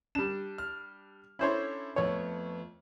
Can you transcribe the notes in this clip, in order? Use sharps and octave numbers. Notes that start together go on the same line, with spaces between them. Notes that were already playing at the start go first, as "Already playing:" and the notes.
G3 D4 E7
F6
C#4 D4 E4 A4 C5 C#5
F2 A3 B3 C#5